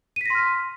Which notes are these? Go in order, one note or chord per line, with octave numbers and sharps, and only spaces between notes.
C6 F6 A#6 B6 D#7